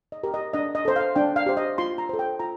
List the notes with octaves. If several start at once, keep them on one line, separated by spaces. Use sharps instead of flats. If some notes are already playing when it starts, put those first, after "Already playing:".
D#5
G4 A#4
D#5
D4 D#5
D#5
A4 C5
F5
D4 G5
F5
G4 C5
D#5
F4 C6
A#5
A4 C5
G5
F4 A#5